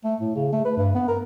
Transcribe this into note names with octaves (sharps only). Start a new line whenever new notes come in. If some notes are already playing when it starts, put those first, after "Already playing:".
A3
A2
C#3
A3
B4
G2
B3
A#4